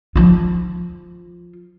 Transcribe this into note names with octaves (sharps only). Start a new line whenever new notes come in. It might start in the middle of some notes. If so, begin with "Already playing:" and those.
F3 F4